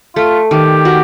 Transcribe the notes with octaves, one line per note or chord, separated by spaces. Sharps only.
A3 F4
D#3 G4
F#4